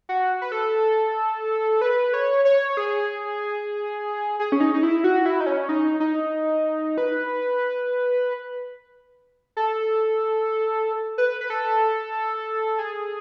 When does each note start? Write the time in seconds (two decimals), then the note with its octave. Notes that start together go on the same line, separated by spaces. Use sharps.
0.09 F#4
0.42 B4
0.52 A4
1.81 B4
2.14 C#5
2.45 C#5
2.77 G#4
4.40 G#4
4.52 C#4
4.60 D#4
4.74 D#4
4.83 E4
5.04 F#4
5.26 E4
5.40 D#4
5.46 C#4
5.69 D#4
6.00 D#4
6.98 B4
9.57 A4
11.18 B4
11.41 B4
11.50 A4
12.79 G#4